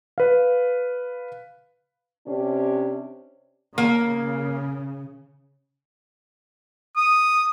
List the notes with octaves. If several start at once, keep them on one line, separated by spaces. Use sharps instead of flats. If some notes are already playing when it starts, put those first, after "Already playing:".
B4 F5
C3 C#4 D4 G4
C#3 A#3
D#6